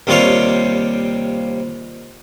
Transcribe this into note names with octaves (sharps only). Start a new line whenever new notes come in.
D#2 C3 G3 F4 C#5 F5